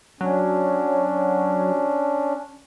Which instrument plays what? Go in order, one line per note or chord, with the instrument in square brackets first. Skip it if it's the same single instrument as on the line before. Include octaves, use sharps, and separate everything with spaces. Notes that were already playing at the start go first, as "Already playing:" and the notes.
[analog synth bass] F#3 [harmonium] C#4 D4